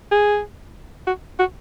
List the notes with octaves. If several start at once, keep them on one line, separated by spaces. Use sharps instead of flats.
G#4
F#4
F#4